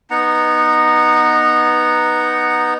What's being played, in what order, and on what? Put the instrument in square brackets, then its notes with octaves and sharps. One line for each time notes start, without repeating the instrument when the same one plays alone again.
[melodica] B3 D#4 F#5 A#5